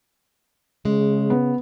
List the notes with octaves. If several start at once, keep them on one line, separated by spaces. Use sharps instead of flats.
C#3 G#3
B3